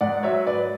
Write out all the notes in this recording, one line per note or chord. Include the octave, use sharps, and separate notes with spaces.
G#2 D5 F#5
F#3 C#5 E5
F#3 B4 D5